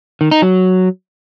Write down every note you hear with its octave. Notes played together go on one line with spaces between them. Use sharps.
D#3
D#4
F#3